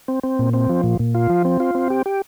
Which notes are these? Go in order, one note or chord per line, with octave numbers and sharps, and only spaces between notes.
C4
C4
A#2
C4
F3
A#2
A#2
F4
F3
C4
F4
C4
G4
G4